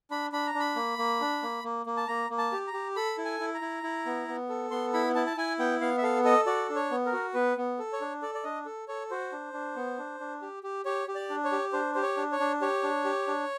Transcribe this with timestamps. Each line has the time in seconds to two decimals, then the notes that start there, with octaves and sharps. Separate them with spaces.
0.11 D4 B5
0.32 D4 B5
0.47 A#5
0.54 D4
0.60 B5
0.76 A#3
0.98 A#3
1.21 D4
1.43 A#3
1.64 A#3
1.86 A#3
1.97 A5
2.08 A#3 A#5
2.30 A#3
2.38 A5
2.52 G4
2.67 A#5
2.73 G4
2.96 A4 B5
3.18 E4
3.25 G#5
3.40 E4
3.54 A#5
3.61 E4
3.83 E4
4.06 B3
4.28 B3
4.49 A4
4.71 B3 C6
4.94 E4 B5
5.15 E4 A5
5.26 A5
5.37 E4 G#5
5.59 B3 G5
5.81 B3 F5
5.98 E5
6.03 A4 F5
6.24 A4 D#5
6.46 F#4 D5
6.69 D4
6.76 C#5
6.91 B3
7.06 A#4
7.13 F#4
7.34 B3 B4
7.57 B3
7.79 A4
7.93 C#5
8.01 D4
8.22 A4 D5
8.35 D5
8.44 D4 D#5
8.66 A4
8.88 A4 C#5
9.11 F#4 C5
9.32 D4
9.53 D4
9.76 B3
9.99 D4
10.20 D4
10.42 G4
10.63 G4
10.85 G4 C#5
11.08 G4
11.15 D5
11.30 D4
11.44 C#5
11.52 G4
11.73 D4 C5
11.95 G4 C5
12.02 C#5
12.17 D4
12.32 C#5
12.40 D4
12.61 G4 C#5
12.83 D4
13.04 G4
13.28 D4